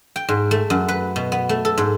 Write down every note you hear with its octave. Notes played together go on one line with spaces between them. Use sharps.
G5
G#2
A3
F#2
B4
B2
B3
A3
A4
G#2